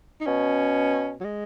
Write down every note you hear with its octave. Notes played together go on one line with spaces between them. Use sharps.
D#4
B2 C#4
F#3
G#3